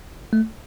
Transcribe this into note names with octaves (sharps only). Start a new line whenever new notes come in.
A3